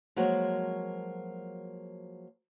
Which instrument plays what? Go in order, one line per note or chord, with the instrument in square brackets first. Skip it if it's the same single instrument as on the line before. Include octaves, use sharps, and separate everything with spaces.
[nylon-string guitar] F3 F#3 G#3 A#3 F#4